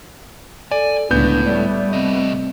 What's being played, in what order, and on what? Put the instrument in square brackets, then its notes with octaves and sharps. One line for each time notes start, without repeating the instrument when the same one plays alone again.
[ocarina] A4 [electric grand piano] D5 [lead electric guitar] G#5
[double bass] C#2 D3 [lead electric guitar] A2 [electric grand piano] B3 G6 [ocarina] D4
[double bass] G3 A3 [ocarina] D5
[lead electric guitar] C3 D#5 [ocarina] C4